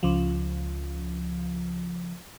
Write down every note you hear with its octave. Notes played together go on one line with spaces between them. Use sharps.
C#2 F3